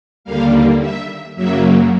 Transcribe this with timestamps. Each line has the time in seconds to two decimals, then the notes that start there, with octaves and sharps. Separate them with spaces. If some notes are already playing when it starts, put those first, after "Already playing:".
0.24 D#2 D3 G3 A#3 F5
0.80 E5
1.36 F#2 C#3 F#3 A#3 E5